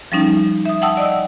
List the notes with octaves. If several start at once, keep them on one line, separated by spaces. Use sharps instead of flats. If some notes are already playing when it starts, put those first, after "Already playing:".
F3 G3 C#4 D#4
E5 D#6
F#5 G5 A5 D#6 E6
D5 D#5 F#5 E6